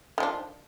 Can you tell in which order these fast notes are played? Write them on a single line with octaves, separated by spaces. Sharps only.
D#3 F3 D4